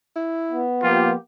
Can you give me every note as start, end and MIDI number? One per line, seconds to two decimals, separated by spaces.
0.16 0.63 64
0.51 1.14 59
0.83 1.14 53
0.83 1.13 58
0.83 1.13 65
0.83 1.13 67